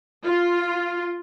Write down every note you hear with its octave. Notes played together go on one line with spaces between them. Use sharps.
F4